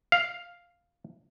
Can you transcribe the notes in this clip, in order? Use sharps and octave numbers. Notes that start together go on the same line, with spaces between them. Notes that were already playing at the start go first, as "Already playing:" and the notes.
F5